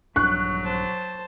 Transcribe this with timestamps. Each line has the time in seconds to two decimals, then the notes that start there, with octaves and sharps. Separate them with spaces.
0.16 A#1 G2 F#3 D4 C#6 F#6
0.64 C5 A5